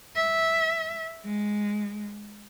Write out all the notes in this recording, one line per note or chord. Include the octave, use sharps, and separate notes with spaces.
E5
G#3